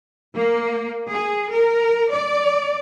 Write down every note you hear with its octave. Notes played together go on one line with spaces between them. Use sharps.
A#3
G#4
A#4
D5